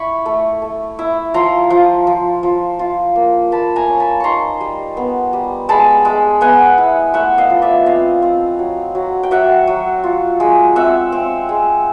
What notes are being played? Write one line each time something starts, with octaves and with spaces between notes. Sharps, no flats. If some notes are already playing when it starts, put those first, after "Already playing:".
Already playing: E4 B5 C#6
A3
A3
E4
F3 A#5 C6
F3
F3
F3
F4
A#3
A#3 A5 B5
G#5 A#5
C#4
A5 B5
D#4 A#5 C6 C#6
G3
B3
G3
G#3 A5 B5
G#3
B3 F#5 G#5
E4
A3 E5 F#5
D#5 F5
F3
D5 E5
C4 D#5 F5
C4
F#3
F#3
G5
F#3 E5 F#5
F#3
F4
G#3
C4 E5 F#5
C4
G#3